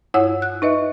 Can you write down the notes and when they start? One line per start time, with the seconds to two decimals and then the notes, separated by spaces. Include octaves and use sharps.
0.14 G2 E4 C#5 F#5 E6
0.42 F#6
0.62 D#4 B4 D#5 E5